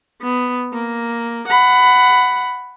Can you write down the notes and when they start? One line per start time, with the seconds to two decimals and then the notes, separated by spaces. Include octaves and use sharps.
0.22 B3
0.73 A#3
1.48 F#5 B5